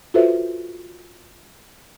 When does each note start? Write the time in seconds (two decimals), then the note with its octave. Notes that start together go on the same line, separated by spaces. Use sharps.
0.14 F4 F#4 A4 B4 C5 E5